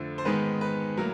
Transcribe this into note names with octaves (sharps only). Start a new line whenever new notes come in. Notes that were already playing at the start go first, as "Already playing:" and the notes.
Already playing: F2 D3 F3 A3
C5
G#2 D#3 G#3 B3 B4
B4
A2 F#3 A#3 A#4